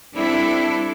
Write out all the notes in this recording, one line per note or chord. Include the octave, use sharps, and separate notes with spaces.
G3 C4 D4 E4 A4